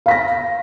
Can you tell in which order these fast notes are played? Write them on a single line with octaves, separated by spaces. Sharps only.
F5 B6 A#6